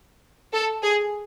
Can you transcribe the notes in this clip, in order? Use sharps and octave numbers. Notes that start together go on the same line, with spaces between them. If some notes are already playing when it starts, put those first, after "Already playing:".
A4
G#4